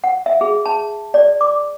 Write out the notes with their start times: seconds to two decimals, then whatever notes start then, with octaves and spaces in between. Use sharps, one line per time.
0.04 F#5
0.26 E5
0.41 G#4
0.66 A5
1.14 D5
1.41 D6